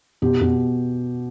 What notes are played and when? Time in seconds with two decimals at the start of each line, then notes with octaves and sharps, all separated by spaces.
0.22 B2 G4
0.41 B2